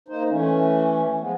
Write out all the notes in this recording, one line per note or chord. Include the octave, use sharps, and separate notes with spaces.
A#3 D#4 C5
E3 A3 C#4
F3 G#3 B3